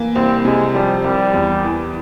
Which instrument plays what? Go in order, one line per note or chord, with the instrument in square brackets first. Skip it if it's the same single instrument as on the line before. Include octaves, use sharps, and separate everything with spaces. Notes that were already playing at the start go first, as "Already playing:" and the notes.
Already playing: [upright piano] E3 A#3
[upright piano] C2 [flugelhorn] C4
[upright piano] C3 [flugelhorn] G#3
[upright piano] F3 [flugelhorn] G3
[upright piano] C2 [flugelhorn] G3
[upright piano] E2
E3